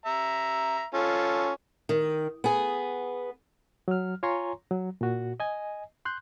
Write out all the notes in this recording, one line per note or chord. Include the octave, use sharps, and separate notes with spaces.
E5 A#5
C#4 F4 A4
D#3
B3 G#4
F#3 F6
F4 C#5 G#5 A#5 C6 C#6
F#3
A#2 F#4
D#5 G#5
C6 F#6 G6